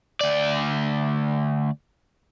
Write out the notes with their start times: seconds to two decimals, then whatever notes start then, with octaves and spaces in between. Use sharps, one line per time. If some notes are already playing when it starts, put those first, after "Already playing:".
0.21 D2 D5